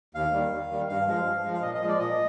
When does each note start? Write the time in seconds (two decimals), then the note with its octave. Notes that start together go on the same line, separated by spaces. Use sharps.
0.15 D#2 F5
0.33 D#3 G3
0.52 D#2
0.71 D#3 G3
0.89 G2 F5
1.07 F3 G#3
1.26 G2
1.44 F3 G#3
1.53 F5
1.62 A#2 D#5
1.75 D#5
1.82 F3 G#3
1.88 D5
1.99 A#2 D#5